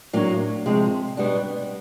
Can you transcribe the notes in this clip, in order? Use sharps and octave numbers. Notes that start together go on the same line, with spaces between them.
A2 F#3 A#3 D4
C3 F3 G#3
B2 G3 B3 D4